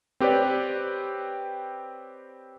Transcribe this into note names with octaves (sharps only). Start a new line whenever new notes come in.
C4 G4 B4 C#5 D5